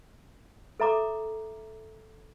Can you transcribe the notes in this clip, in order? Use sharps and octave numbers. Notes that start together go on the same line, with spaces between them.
A4 E5 A#5 D6